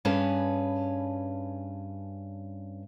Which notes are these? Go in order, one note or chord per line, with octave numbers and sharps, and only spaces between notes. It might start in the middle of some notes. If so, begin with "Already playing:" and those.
G2 C#4 G#4 B4 A5